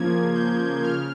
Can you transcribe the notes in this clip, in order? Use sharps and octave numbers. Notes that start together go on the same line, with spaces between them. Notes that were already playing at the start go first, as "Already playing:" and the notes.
Already playing: C#3 F3 A#3 G#6
G6
C#3 F6